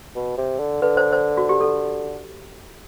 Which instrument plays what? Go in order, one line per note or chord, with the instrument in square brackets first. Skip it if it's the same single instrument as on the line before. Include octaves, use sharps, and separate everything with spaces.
[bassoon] B2
C3
D3
[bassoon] D3 [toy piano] B4
[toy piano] C5
C5
F#4
G4
A4